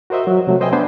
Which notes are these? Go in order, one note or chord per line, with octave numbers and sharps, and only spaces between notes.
F#4 A#4 C5 D#5 E5
F#3
C3 F#3 A3
B4 C5 D#5 E5 G5 G#5
B3 D4 B4 C5 E5 G#5